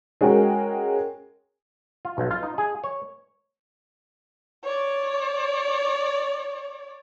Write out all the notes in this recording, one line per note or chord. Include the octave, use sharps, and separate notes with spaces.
G#3 C#4 F#4 A#4 G5
F4
B1
F4
D#4
G#4
C#5
C#5 D5